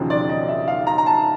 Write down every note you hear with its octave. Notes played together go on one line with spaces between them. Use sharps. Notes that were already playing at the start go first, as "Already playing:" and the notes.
Already playing: E1 D#2 C#3 F3
D5
D#5
E5
F5
A#5
A#5
A5